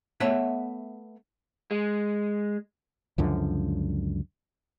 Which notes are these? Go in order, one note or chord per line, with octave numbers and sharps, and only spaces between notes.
A3 B3 C#5 E5 F#5
G#3
C#2 F#2 D3 F3